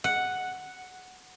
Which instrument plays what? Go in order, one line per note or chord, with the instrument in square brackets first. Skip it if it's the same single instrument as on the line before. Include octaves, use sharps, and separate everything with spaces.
[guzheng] F#5